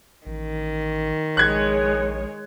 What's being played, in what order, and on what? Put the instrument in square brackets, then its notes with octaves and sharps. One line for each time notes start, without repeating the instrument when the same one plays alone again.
[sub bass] A1 [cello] D#3
[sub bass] A#1 [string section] G#3 C#5 [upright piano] F#6 G#6